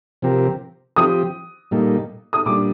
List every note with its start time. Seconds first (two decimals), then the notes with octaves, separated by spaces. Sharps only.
0.22 C3 F3 C4 G4 A#4
0.96 F3 C4 G4 D#6
1.71 A#2 G3 A#3 D#4 A4
2.33 D#6
2.46 A#2 G3 D4 D6